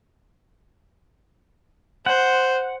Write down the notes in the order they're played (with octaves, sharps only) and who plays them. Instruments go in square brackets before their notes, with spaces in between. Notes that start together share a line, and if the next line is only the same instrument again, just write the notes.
[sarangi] C5 [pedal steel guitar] F#5